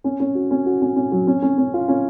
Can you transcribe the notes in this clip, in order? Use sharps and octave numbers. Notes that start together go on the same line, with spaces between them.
C#4
C#4
F#4
C#4
F#4
C#4
C#4
F#3
C#4
C#4
C#4
F4
C#4